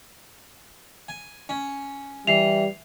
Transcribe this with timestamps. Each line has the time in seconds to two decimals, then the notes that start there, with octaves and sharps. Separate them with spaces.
1.09 G#5
1.49 C#4
2.27 E3 G3 C7 F7